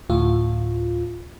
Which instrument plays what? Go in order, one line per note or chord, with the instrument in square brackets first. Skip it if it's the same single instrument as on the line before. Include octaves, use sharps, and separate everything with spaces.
[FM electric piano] D2 A2 F4